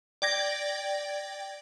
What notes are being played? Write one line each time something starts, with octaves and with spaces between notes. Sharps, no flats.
D5 G5 G#6 A#6